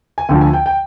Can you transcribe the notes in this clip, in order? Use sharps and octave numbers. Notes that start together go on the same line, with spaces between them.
G#5
D2 D3 F3 G5
G#5
G5
G5